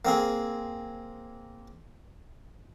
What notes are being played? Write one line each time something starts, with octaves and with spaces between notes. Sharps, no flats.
A#3 C4 G#4